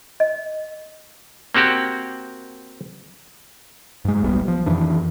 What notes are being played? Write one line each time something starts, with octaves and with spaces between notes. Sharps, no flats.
D#5
A#3 C4 F#4 G4
G2 G#3
D#1 B1 G3 B3
F3
F2 D#3 E3 D4